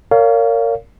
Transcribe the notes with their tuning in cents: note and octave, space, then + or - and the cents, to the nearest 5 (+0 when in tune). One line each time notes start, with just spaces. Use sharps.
A#4 -25 C#5 +35 F5 +0